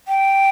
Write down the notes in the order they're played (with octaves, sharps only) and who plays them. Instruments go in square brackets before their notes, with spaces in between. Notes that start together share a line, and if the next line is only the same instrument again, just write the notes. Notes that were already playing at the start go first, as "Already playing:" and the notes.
[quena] G5